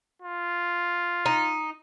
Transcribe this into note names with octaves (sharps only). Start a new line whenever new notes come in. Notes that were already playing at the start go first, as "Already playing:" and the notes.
F4
D#4